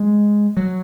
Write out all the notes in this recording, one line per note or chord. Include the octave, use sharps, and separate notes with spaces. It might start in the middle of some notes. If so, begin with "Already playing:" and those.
Already playing: G#3
F#3